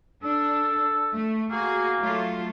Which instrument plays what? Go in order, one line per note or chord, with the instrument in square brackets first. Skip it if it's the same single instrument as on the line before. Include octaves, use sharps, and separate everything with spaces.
[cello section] D4 [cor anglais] A4
[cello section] A3
[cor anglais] A#3 [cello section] F#4 G#4
[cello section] F#3 A3 F4